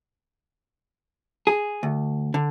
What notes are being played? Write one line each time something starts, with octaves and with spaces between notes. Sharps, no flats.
G#4
D2
D3